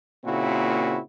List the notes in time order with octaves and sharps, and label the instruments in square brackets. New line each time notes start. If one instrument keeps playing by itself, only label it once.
[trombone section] A#2 C#3 A#3 C4 E4 F#4